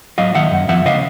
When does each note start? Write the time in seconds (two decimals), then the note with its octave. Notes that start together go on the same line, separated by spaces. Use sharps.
0.18 F#3 D#5 F5
0.35 D#3 E5 F#5
0.51 F#2
0.69 F3 E5 F#5
0.85 C#3 D#5 F5